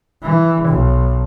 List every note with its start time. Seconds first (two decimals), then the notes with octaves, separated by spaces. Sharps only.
0.22 E3
0.68 B1